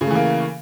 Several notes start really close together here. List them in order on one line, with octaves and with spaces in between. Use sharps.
C#3 A3 E3 A#3